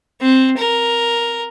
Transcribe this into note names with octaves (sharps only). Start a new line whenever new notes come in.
C4
A#4